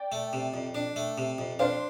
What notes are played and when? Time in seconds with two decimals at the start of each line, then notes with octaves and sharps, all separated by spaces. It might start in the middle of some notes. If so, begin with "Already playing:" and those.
Already playing: D5 G5
0.12 A3
0.33 C3
0.54 F2
0.75 D4
0.96 A3
1.18 C3
1.38 F2
1.59 D4 C5 F5